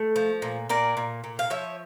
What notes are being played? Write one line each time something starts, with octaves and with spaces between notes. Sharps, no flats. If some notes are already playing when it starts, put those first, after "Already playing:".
Already playing: A3
F3
A#2
A#2 A#4 D5
A#2
A#2
F5
F3 C#5 E5